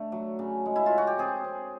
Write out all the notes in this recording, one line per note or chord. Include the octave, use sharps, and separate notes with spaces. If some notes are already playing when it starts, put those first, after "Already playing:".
Already playing: D3 A3
F#3
C#3
G#3
E4
F4
C#3
F#4
G4
C4 G#4
C4